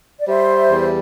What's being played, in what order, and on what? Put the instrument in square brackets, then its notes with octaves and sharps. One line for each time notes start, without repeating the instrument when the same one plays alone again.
[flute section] D5
[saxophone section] G3 [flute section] C5 E5
[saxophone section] E2